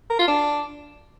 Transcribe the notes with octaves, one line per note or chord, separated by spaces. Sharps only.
A#4
F4
D4